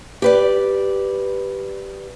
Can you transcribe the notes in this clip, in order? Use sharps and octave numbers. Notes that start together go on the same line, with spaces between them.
G4 B4 D5